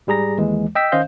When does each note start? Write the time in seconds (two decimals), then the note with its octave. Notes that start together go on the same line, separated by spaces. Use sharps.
0.07 G#2 G3 G#4 A#5 A#6
0.38 D#2 E3 G#3
0.75 D#5 G5 E6 B6
0.92 D#3 C#4 C5 D#5 F5 G6